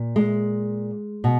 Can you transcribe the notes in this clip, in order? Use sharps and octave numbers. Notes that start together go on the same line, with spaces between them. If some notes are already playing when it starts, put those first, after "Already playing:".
Already playing: A#2
G#3
B2